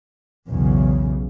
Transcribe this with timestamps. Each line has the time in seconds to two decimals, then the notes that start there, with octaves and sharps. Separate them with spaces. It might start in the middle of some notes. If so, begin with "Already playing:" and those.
0.47 B1 E2 C#3